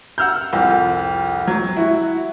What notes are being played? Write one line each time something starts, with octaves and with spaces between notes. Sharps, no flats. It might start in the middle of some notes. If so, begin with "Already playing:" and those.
F#5 E6 F6 G6
C2 F2
F#3
E4 F#4